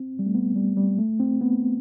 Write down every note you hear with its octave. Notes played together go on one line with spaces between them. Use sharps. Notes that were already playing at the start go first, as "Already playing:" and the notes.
Already playing: C4
G3
A3
B3
G3
G3
A3
C4
B3